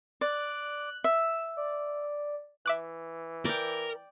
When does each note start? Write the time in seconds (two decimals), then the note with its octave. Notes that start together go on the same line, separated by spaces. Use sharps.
0.21 D5 F#6
1.04 E5 E6
1.57 D5
2.66 E3 E5 D6 F#6
3.45 A#4 D5 G5